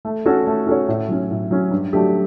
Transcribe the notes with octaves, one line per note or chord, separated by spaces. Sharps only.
A3
C#4 F#4 A4 C#5
A3
C#4 F#4 A4 C#5
A2
F#3 C#4
A2
F#3 C#4
G2
F#3 A3 D4 G4